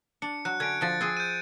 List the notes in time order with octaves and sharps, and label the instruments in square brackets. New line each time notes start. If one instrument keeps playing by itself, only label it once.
[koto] D4 [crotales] C#7
[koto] F#3 [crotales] F#6
[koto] D3 C#4 [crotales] G#6 D7
[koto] D3 F3 [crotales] A6 C#7
[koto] C4 G#4
[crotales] G6 D#7